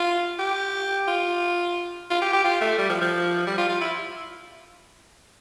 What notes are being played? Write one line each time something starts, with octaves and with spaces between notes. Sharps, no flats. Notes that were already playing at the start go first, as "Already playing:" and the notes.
Already playing: F4
G4
F4
F4
G4
G4
F4
A3
G3
F3
F3
G3
F4
F4
E4